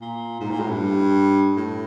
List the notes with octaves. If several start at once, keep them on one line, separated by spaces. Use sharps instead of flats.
A#2
G#2
A#2
A2
G2
A2